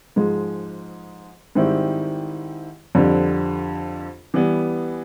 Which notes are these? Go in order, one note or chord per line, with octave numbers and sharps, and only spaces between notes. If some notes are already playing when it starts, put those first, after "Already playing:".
G#2 F3 G#3
G#2 D#3 G3 C4 E4
F2 D3 G3 C4
E3 G3 B3